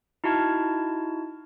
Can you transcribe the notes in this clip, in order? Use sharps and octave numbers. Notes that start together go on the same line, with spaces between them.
D#4 E4 F#4 A5 F6 G#6